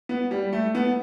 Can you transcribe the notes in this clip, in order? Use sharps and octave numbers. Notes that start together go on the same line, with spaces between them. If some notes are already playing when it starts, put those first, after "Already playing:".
B3
G3
A3
B3